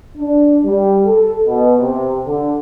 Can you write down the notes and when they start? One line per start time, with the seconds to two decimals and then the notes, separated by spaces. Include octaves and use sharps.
0.18 D4
0.64 G3
1.05 A4
1.46 B2
1.80 C3
2.26 D3